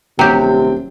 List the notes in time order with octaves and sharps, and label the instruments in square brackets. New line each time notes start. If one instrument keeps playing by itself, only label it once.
[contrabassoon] D#1 [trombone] C3 [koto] F#3 G4 [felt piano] G5